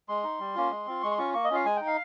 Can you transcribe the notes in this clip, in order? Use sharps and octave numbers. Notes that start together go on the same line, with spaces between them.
G#3 C6
D#4
G3
A#3 C#4 F4
G#3
C4 F4
G#3 C#6
C6
C#4 F4 C#6
A#3 C#6
D#5
C#4 F4 F5
G#3 G#5
D#4 G5
F5